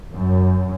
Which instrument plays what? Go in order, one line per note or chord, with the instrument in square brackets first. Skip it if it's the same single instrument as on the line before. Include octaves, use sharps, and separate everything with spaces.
[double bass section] F#2